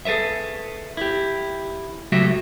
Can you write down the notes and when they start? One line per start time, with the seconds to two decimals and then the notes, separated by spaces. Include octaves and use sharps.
0.05 G#4 A4 B4 C5 E5
0.97 E4 G4
2.12 C#2 F#3 A3 F#4 G4 E5